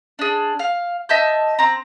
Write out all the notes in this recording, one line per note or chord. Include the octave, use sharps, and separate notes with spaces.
D4 G#4
F5
D#5 E5 A5 G6
C4 A#5